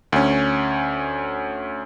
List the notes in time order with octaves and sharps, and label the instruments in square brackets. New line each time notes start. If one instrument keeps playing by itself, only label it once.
[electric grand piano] D2 C#4